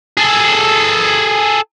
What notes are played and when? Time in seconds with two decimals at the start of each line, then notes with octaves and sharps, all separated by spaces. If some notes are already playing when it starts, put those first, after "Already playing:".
0.17 G#4 A4